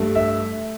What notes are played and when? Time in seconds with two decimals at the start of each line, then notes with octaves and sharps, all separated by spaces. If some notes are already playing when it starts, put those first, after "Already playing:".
Already playing: G2 A3
0.15 E5